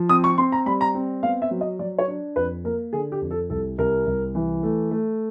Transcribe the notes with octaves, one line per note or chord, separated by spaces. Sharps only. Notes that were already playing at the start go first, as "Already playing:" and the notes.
Already playing: F3
C4 D#6
C#6
C4 C6
A#5
G3 B5
A#5
C4
B3 F5
E5
F#3
D#5
F#3 D5
C#5
D4
F2 B4
A#3 A#4
D3 G#4
G4
F2
A4
C2 A4
C2 A#4
C2
E3
A3
A3